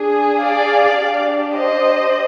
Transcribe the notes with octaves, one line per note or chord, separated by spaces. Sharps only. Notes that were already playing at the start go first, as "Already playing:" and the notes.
Already playing: D4 G#4
D5 F5
D4 G4
C5 D#5